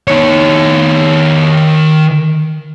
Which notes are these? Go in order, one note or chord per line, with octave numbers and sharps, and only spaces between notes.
D#3 C#5